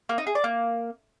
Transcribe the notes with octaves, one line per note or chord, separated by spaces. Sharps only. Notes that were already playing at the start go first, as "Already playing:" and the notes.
A#3
D#4
G#4
D5
A#3